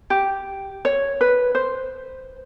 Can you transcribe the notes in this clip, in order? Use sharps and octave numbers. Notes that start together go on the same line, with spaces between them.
G4
C#5
B4
C5